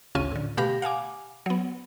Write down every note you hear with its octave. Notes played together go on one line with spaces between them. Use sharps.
A1 D2 C#3 C#4 F4 D#7
A2 D3
B2 A3 G4 F5 B5 A#6
F5 F#5 G#5 D6
F#3 B3